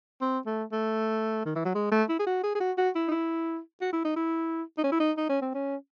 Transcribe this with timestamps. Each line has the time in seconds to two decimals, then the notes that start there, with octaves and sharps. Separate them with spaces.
0.21 C4
0.46 A3
0.72 A3
1.45 D#3
1.55 E3
1.65 F#3
1.75 G#3
1.91 A3
2.09 E4
2.19 G#4
2.27 F#4
2.43 G#4
2.55 G#4
2.60 F#4
2.78 F#4
2.95 E4
3.08 D#4
3.11 E4
3.81 F#4
3.93 E4
4.05 D#4
4.16 E4
4.78 D#4
4.84 C#4
4.92 E4
5.00 D#4
5.17 D#4
5.29 C#4
5.42 C4
5.54 C#4